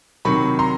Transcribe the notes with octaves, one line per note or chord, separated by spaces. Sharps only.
C3 D#3 F#3 B5 C#6
A#5 C6